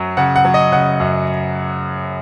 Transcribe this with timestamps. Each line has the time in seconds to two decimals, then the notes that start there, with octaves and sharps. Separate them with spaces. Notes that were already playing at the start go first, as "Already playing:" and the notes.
Already playing: F#2 F#3
0.17 C#3 F#5
0.36 F#5
0.45 F#3
0.54 D#5
0.72 C#3 F#5
1.00 F#2